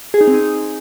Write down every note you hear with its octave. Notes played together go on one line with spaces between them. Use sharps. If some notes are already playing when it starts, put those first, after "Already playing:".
G#4
D#4
C4
D#4